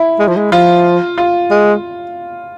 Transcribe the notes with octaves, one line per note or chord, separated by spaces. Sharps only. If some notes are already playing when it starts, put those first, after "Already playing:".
Already playing: E4
G#3
F3
G#3
F3 F4
F4
G#3